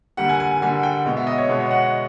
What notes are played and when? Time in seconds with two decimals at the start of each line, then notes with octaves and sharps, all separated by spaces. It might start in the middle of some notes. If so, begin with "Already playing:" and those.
0.17 D3 G3 A#3 F#5
0.29 G#5
0.40 G#5
0.51 G#5
0.61 D3 G3 A#3 G#5
0.83 G5
1.06 B2 G#3 B3
1.17 E5
1.27 D#5
1.38 C#5
1.49 B2 G#3 B3
1.60 C#5
1.71 F#5